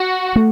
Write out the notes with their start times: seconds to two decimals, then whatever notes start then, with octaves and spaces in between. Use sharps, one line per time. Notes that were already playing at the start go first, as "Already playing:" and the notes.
Already playing: F#4
0.35 A3